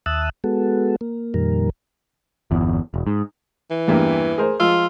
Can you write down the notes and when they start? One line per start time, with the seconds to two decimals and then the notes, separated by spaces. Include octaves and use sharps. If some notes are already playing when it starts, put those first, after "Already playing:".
0.06 D#2 E5 A5 D#6 E6 F#6
0.44 G#3 B3 F#4 A4
1.01 A#3
1.34 F2 A#2 D#3 G3 A#4
2.51 G1 E2
2.94 E1
3.07 G#2
3.70 E3
3.88 E2 G2 A#3
4.38 G#4 A#4 C5
4.60 F3 G#3 F4 E6